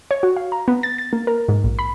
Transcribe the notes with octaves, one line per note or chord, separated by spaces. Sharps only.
C#5
F#4
F5
A#5
B3
A6
A6
A#3
A#4
G#2
A#1
B5